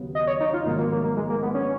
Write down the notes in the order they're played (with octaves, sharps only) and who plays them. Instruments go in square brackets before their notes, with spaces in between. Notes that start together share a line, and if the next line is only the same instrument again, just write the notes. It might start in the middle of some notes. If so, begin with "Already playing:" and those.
Already playing: [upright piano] D#2 C#3 F#3 B3
[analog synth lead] D#5
C#5
D#4
F4
[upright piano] A#1 G#2 D#3 F#3 [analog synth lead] A#3
[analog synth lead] A#3
A#3
A#3
G#3
A#3
B3
C#4